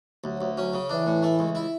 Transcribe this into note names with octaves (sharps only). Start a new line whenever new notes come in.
D2 F#3
D2
F#3 C#4
C#3
E3 D4
A2
A3
C#2
E4